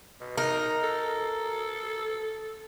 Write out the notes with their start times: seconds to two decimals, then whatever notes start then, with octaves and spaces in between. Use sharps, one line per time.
0.20 B2
0.38 D#4 A#4
0.83 A4